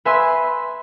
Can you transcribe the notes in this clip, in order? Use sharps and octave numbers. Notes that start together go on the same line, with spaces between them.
B4 E5 G#5 C6 E6